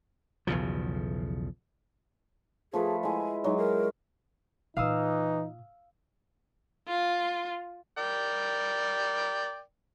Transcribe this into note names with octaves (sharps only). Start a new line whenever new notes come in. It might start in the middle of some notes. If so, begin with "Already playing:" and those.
B1 E2 C#3 F3
F3 A3 G#4 B4
G#3 E4 G#5
F#3 G#3 D#4
A#4
A#2 E3 D#4 F4 F5 D#6 E6
F4
A#4 D5 G5